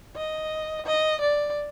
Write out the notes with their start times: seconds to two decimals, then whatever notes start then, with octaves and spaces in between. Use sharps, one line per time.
0.16 D#5
0.86 D#5
1.21 D5